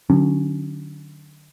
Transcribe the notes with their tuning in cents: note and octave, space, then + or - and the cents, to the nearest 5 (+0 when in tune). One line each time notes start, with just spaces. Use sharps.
D3 +30 F#3 +5 C#4 +0